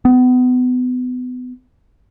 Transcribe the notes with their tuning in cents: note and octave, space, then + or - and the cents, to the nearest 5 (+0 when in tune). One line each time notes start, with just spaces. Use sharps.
B3 +30